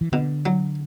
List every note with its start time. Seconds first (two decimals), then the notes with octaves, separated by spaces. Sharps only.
0.01 E3
0.12 B2 D3
0.46 F#3